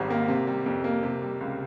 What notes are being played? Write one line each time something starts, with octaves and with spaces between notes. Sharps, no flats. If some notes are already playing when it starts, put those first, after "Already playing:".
Already playing: G#1 G#2 G3
A#3
C3
G3
F2
A#3
C3
G3
C#2